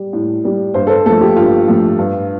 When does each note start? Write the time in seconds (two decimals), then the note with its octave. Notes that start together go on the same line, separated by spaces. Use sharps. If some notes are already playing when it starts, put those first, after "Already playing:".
Already playing: G3
0.13 A2
0.45 G3
0.74 G2 C5
0.87 A4
0.90 C5
1.06 F3 A3 A4
1.21 G4
1.36 G2 F4
1.68 F3 A3
1.98 G2